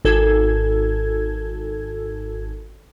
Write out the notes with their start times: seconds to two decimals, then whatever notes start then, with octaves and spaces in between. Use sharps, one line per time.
0.05 G#1 A4 G#6